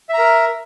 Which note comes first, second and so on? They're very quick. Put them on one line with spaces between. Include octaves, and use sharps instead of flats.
E5 A#5 A#4